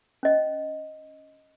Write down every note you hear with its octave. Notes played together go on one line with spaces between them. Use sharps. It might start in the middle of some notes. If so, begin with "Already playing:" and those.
C#4 D#5